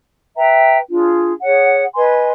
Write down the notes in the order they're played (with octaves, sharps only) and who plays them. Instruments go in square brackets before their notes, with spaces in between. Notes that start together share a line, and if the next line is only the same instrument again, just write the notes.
[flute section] B4 E5 G5 A#5
D4 F4 G#4
G#4 C#5 F#5
B4 D#5 G#5 C6